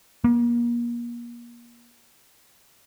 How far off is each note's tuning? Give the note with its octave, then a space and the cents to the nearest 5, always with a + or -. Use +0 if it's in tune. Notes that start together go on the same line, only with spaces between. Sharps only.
A#3 +35